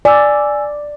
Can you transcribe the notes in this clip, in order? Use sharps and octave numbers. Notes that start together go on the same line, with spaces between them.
D5 G#5 E6